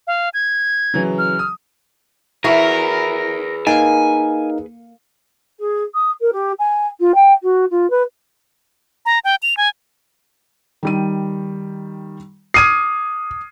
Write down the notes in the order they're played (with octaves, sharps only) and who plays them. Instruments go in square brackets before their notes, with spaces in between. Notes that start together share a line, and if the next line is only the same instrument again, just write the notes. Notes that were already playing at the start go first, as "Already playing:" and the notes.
[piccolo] F5
G#6
[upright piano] C#3 E3 F#3
[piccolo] F6
[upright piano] D#6
[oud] E3 E4 F#4 [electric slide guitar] G#4 B4 [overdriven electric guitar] A#4
[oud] A#3 [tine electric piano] D#4 A#4 F5 [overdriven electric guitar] G#5
[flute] G#4
D#6
A#4
G4
G#5
F4
G5
F#4
F4
B4
[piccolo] A#5
G5
F7
G#5
[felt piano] D#3 G3 D#7
[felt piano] D6 F6 G#6 [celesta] D#6 [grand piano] C7 D#7